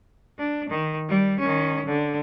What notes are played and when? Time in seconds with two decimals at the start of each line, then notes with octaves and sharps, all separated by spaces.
0.38 D4
0.70 D#3
1.09 G3
1.40 D#3 C#4
1.86 D3